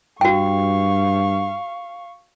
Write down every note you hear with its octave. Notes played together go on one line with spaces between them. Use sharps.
G2 F#4 F5 G5 C#6